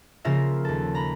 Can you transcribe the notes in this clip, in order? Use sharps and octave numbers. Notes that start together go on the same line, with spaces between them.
C#3 F3 A#3 F4 A#4 E5
D#2 A4
A#5 B5